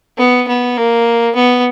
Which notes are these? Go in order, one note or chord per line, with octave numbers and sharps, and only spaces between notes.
B3
B3
A#3
B3